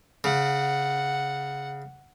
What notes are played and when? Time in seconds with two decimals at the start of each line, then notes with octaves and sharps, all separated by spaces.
0.24 C#3 F#5